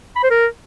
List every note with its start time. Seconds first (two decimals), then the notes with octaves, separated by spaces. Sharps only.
0.16 B5
0.23 C5
0.31 A#4